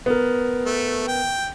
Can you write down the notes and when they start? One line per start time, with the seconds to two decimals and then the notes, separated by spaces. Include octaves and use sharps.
0.06 B3 A#4
0.66 A3
1.08 G5